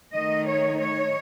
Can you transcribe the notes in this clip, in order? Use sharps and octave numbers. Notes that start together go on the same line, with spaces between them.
D#3 A3 D#4 D#5
C#5
C#5